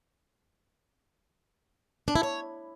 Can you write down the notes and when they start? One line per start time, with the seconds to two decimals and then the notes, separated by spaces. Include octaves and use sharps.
2.08 D4
2.15 E4
2.23 C#5